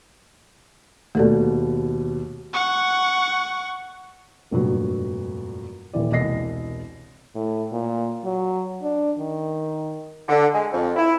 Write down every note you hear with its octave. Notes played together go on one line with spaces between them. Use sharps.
D#2 B2 A3 A4 D5
F#5 C#6
F1 G2 A#2 F#3
D#1 E3 D5
E1 C2 D#5 A#6 C7
A2
A#2
F#3
D4
D#3
D3
G#3
F2
E4